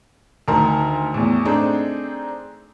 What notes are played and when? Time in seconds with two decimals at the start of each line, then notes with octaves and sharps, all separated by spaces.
0.48 D2 D#3 A#4 A5 C6
1.14 E2 A2
1.45 A3 C4 D4 D#4 G#4